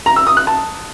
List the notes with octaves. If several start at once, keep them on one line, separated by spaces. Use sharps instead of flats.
A#5
E6
D#6
F#6
A5